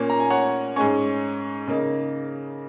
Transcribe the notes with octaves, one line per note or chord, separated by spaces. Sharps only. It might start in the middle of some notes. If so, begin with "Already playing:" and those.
Already playing: A#2 A#3 C#4
A#5
G#5
C#5 F#5
G#2 G#3 C#4 G#5 C#6
C#3 A#3 D#4